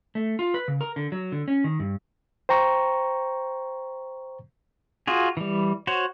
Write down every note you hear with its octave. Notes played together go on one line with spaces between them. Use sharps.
A3
F4
B4
C#3
A#4
D3
F#3
D3
C#4
D#3
G2
C5 G5 A#5 C#6
F4 F#4 G#4
E3 G3
F#4 C5 C#5